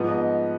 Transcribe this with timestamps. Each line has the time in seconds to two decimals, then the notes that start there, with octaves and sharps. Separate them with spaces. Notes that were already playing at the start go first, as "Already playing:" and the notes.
Already playing: G#2 F3 B3
0.09 D#5